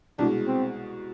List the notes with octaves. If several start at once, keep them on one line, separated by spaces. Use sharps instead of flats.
C2 B2 G#3 D4
C4